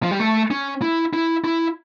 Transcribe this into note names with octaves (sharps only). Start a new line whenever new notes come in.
F3
G3
A3
C#4
E4
E4
E4